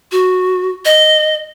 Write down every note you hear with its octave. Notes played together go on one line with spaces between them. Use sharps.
F#4
D#5